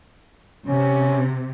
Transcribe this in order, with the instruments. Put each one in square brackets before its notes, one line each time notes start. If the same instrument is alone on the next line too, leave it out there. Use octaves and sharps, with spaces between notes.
[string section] C3 [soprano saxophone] C#4